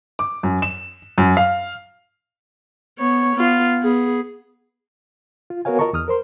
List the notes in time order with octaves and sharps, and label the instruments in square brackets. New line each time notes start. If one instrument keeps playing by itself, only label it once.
[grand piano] D6
F#2
E7
F#2
F5
[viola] B3 C#5
B3 F4
B3 G#4
[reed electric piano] F4
B3 F#4 A#4 C#5 F5 G#5
F4 A#4 D#5 A5 A#5 C#6
E2 D#6 F6
A#4 C5 C6